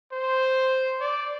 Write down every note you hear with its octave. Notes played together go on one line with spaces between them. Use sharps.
C5
D5